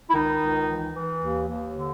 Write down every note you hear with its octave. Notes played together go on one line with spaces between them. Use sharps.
E4
C#2 D#3 D#4
C#2
E3
E3
D#2
D#2
D3